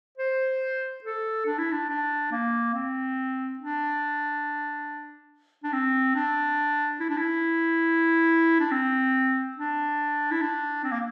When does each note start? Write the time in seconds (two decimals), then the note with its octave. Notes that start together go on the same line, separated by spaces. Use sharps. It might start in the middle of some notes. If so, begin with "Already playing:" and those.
0.17 C5
1.04 A4
1.46 D4
1.58 E4
1.72 D4
1.89 D4
2.31 A#3
2.74 C4
3.59 D4
5.64 D4
5.73 C4
6.15 D4
7.00 E4
7.09 D4
7.17 E4
8.60 D4
8.71 C4
9.57 D4
10.31 E4
10.41 D4
10.84 C4
10.92 A#3